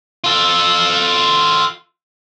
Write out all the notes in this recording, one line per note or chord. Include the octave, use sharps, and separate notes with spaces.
F4 A4